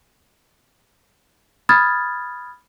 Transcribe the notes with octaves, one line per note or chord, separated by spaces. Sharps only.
B5 D#6 F6 G#6 A6